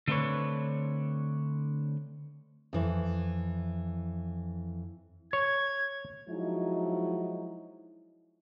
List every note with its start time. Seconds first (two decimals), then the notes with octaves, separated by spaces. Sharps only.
0.08 D3 A3 C4 D4 B4 C#5
2.73 F2 E3 E4
5.33 C#5 G#6
6.29 F3 F#3 G#3 D#4 E4